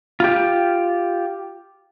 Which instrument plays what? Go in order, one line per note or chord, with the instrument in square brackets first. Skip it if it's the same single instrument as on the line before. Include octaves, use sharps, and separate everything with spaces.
[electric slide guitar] F4 G4